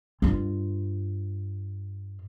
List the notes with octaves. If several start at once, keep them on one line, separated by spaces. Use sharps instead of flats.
G2 F4